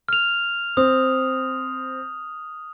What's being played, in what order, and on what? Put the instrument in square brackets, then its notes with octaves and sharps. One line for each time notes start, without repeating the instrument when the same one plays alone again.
[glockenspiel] F6 F7
[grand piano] C4 [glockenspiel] D#6